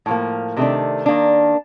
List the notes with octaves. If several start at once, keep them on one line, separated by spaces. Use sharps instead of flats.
A2 F3 A#3
C3 D#3 A3 D4
D#3 A#3 D4